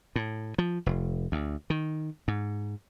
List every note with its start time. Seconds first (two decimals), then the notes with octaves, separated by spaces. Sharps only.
0.16 A2
0.58 F3
0.86 F1
1.32 D2
1.70 D#3
2.28 G#2